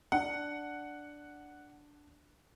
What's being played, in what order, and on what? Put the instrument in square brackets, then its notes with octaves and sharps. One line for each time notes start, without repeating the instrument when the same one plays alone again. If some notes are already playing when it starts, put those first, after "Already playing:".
[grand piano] D4 [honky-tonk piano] F#5